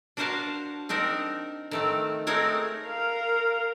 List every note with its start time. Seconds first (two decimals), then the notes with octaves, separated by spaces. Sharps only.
0.17 D4 F#4 A#4 C5 F5 A5
0.89 C4 D4 D#4 A#4
1.71 D#3 A3 C4
2.27 G#3 A3 C4 D#4 A#4 C#5
2.85 A#4 F5